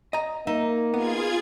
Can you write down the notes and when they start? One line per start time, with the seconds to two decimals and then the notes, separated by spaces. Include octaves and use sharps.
0.13 D#5 A#5
0.47 A#3 D#4 E5
0.94 B3 F4 G#4 G#6